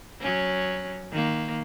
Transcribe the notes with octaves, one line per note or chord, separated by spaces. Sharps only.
F#3 C#4
D#3 A#3